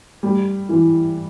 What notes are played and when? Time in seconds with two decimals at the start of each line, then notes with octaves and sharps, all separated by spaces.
0.23 G3
0.69 E3